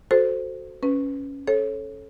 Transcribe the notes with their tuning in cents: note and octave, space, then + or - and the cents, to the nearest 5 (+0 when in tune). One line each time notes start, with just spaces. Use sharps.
F#4 +0 A4 +0 C5 -5
C#4 +0 B4 +5
A4 -20 C#5 -30